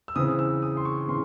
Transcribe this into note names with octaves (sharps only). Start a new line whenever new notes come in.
E6
C#3 E3 C4 D#6
E6
D#6
C6
C#6
C#3 E3 C6